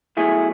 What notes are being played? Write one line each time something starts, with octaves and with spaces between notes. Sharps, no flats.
B1 B2 F#3 A3 E4 G#4